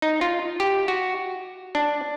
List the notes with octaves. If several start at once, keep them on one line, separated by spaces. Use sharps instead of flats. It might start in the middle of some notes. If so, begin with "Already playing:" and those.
D#4
F4
G4
F#4
D4